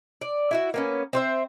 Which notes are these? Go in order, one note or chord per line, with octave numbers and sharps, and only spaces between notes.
D5
E4 F#4 E5
A#3 B3 C#4
C4 C5 E5